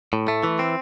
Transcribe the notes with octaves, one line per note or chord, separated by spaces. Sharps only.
A2
A3
E3
C4